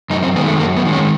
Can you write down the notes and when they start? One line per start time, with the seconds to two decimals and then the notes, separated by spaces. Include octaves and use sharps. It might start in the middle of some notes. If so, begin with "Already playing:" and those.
0.10 F#2 D#4
0.23 C4
0.35 D#3 G#3 B3
0.48 A3
0.60 F#2 A#3
0.76 B3
0.85 D#3 G#3
0.93 C#4